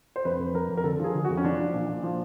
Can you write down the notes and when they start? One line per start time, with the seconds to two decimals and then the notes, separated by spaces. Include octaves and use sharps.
0.16 C5
0.25 F2 B4
0.39 F2
0.54 F2 A#4
0.69 F2
0.77 A#4
0.84 D3 A4
1.00 F3 G#4
1.14 D3
1.25 F#4
1.30 F2
1.37 C#4
1.44 F3 D4
1.59 F3
1.74 A#2
1.89 A#2
2.03 F3